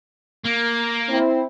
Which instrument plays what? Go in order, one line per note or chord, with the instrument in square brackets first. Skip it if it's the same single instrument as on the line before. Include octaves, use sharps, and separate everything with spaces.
[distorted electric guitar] A#3
[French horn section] C4 E4